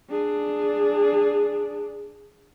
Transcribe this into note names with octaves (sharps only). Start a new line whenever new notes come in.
D4 G#4